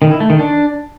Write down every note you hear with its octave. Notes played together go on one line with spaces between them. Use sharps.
D#3
E4
A3
D#3
D4